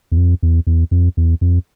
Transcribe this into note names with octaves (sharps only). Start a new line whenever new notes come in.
E2
F2
E2
E2
F2
E2
F2